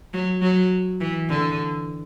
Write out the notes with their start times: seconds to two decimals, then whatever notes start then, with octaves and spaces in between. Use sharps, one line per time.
0.13 F#3
0.42 F#3
1.01 E3
1.29 D3